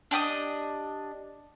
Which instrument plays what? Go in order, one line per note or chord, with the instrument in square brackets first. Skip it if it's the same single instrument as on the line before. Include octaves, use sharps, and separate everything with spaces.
[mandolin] D4 G4 D#5 D#6